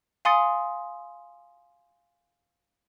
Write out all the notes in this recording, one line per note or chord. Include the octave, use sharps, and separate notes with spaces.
F5 G#5 C6 D#6 A6 C#7